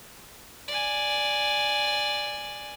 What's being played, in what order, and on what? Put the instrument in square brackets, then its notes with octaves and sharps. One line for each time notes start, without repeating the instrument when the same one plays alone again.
[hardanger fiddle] D5 G#5